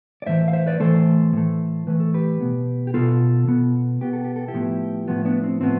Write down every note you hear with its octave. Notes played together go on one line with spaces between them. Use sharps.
D5
A2 E3 A3 C5 E5
F5
C5 E5
B4 D5
A2 E3 A3 A4 C5
A2 E3 A3
A2 E3 A3 B4
A4
G4 B4
B2 B3
G4
B2 B3 F4 A4
B2 B3
B2 B3 G4
A4
G4
A4
E4 G4
A2 F3 B3
A2 F3 B3
B3 D4
C4
A2 F3 B3 C4